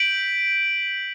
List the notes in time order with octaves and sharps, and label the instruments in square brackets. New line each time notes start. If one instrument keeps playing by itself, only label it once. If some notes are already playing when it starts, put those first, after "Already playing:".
Already playing: [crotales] G6 B6 D7 F#7